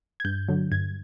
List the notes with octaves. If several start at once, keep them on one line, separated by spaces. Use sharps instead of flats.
G#6
G2 G6
D3 F#3
G2 G#6